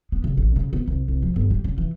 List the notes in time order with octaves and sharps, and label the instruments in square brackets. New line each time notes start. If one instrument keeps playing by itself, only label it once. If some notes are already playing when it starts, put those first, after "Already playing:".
[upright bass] B3
C#3
A1
C#3
B3
C2
C2
F3
G1
G3
C#3
E3